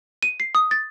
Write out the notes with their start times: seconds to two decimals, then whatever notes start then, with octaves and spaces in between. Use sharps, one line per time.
0.23 D#7
0.40 C7
0.55 D#6
0.71 A6